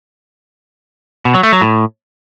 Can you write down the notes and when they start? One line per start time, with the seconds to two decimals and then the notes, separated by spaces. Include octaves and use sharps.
1.25 B2
1.34 F#3
1.43 A3
1.52 F#3
1.61 A2